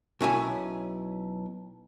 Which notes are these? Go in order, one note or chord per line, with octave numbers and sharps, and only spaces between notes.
B1 C#4 E4 G#5